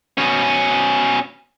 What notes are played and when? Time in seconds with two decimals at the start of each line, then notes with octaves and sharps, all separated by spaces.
0.18 B2 C#4